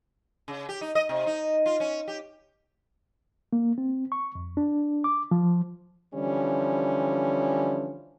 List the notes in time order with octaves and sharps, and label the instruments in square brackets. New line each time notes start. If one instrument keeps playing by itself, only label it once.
[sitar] C#3
G4
D#4
D#5
C3
D#4
F4
C#4
G4
[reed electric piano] A#3
C4
C#6
F2
D4
D6
F3
[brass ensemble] D3 E3 F3 G3 C#4